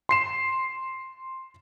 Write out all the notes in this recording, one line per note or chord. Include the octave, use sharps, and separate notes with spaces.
C6 C7 E7